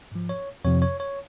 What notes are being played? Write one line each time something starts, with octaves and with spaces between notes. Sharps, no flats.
G#2 F3
C#5
F2 C3 F3 C#5
C#5
C#5